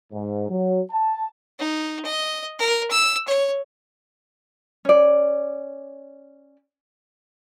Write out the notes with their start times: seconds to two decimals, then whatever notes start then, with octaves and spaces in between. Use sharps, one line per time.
0.12 G#2
0.49 F#3
0.91 A5
1.59 D#4
2.05 D#5
2.59 A#4
2.91 E6
3.28 C#5
4.85 C#4 D5